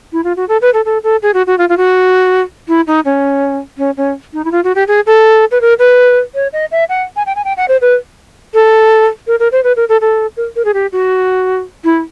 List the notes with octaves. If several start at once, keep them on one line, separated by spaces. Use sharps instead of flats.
E4
F4
F#4
A4
B4
A4
A4
A4
G#4
F#4
F#4
F4
F4
F#4
E4
D#4
C#4
C#4
C#4
D#4
E4
F4
F#4
G4
G#4
A4
B4
A#4
B4
C#5
D#5
E5
F#5
G#5
G5
G#5
G5
F#5
C5
B4
A4
A#4
A#4
C5
B4
A#4
A4
A4
A#4
A#4
G#4
G4
F#4
E4